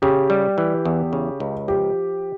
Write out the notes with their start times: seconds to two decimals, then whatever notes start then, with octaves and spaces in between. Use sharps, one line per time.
0.02 C#3 G4
0.30 G3
0.58 E3
0.85 E2
1.13 C#3
1.40 C#2
1.68 F3 G4